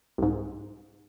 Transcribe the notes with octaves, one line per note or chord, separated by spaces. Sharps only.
C2 G#2